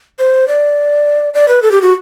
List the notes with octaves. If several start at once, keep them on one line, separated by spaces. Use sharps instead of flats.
C5
D5
D5
B4
A4
G4
F#4